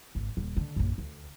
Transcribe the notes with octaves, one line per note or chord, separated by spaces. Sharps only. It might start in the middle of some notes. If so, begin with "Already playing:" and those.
G#1
D#1
D3
A#1 F#2
D2